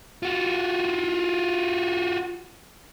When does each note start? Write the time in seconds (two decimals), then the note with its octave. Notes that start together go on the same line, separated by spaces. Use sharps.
0.23 F4 F#4